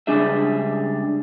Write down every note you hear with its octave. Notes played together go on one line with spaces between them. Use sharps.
C#2 G3 D4 G#4 E5